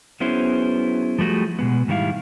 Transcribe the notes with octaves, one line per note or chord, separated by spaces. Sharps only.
F#3 B3 C#4 E4 G#4 C5
F3 G3 A3 F#4 G#4
B2 G#3 B3
G#2 D#3 G3 E4 F5